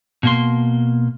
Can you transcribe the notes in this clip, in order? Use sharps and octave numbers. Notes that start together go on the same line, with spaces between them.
B2 A#3 C6